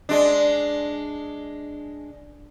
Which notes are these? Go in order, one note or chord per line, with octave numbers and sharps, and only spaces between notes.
G#3 D4